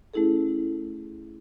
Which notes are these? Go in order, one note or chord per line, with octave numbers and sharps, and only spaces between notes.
A3 C#4 E4 G#4 A4